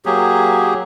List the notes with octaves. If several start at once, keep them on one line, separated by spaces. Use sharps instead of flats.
F#3 A#3 G4 G#4